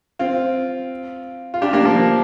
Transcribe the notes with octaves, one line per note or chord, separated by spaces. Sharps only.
C4 F4
F4
D4 G4
A#3 D4
F3 A#3